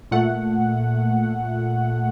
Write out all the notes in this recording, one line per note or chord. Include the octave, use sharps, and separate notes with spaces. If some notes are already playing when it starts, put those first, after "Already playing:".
A#2 A3 F#5